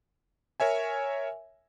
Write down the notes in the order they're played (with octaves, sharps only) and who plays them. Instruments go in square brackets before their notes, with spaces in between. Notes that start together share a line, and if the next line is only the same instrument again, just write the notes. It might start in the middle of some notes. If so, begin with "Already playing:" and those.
[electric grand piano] A#4 C#5 E5 G#5